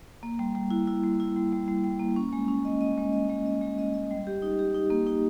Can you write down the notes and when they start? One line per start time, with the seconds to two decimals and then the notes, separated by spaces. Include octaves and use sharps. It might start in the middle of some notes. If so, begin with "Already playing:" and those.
0.23 A#3
0.39 G3
0.55 G3
0.71 E4
0.88 E4
1.03 G3
1.20 E4
1.36 G3
1.52 G3
1.68 G3
1.84 G3
2.00 A#3
2.16 C#4
2.33 G#3
2.48 C#4
2.65 D#5
2.81 D#5
2.98 G#3
3.13 D#5
3.30 G#3
3.46 D#5
3.61 G#3
3.78 D#5
3.94 D#5
4.11 G3
4.27 G4
4.42 D#4
4.59 G4
4.74 D#4
4.90 A#3
5.07 D#4